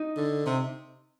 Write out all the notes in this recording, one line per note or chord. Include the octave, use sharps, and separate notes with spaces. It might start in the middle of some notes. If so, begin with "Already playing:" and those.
Already playing: D#4
D3
C3